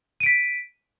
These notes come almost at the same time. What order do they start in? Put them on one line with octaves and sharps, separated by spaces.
D#7 D7 B6